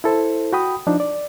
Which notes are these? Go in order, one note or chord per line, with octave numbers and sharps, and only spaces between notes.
E4 A4 C5
F#4 G5 B5 D#6
F3 D4 D#4
D5